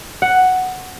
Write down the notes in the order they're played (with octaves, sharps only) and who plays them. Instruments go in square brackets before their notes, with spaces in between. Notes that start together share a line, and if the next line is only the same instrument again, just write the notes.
[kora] F#5